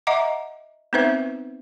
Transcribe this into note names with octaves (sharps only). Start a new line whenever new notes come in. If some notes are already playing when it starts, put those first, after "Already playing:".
D#5 E5 F#5 A#5 D6
B3 C4 D#4 B4 C5 E5